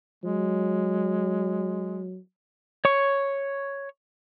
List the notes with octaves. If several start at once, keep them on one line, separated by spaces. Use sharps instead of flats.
F#3 G#3
C#5 C#6